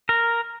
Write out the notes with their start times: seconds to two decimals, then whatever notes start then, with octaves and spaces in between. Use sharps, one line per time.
0.09 A#4